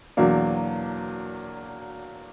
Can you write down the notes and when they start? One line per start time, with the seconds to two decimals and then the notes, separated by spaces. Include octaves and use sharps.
0.17 E2 B2 F#3 A#3 D4